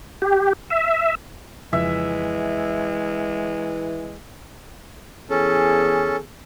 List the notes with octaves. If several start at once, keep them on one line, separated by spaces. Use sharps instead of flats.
G4
E5
F2 C#3 E3 F3 G#3 E5
E2 C#4 G#4 A4